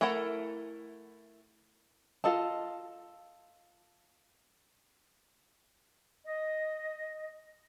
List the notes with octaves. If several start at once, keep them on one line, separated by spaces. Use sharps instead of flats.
A3 E4 A4 A#4 F#5
F4 A4 D#5 A5
D#5